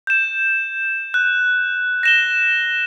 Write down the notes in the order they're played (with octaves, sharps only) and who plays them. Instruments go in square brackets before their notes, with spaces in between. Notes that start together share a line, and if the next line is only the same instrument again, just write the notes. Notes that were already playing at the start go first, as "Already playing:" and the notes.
[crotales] G6 E7
F#6
A#6 E7 G7